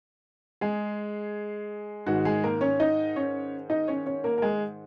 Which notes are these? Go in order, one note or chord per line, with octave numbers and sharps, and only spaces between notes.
G#3 G#4
G#2 D#3 G#3 F#4
G#3 G#4
A#3 A#4
C#4 C#5
D#4 D#5
C#4 C#5
D#4 D#5
C#4 C#5
C#4 C#5
A#3 A#4
A#4
G#3 G#4